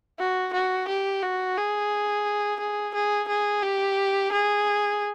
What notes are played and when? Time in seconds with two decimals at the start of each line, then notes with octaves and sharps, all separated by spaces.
0.19 F#4
0.53 F#4
0.88 G4
1.23 F#4
1.57 G#4
2.60 G#4
2.94 G#4
3.28 G#4
3.63 G4
4.32 G#4